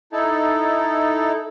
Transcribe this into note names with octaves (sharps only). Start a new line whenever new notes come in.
D#4 E4 A4